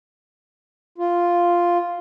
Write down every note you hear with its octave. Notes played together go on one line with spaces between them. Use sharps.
F4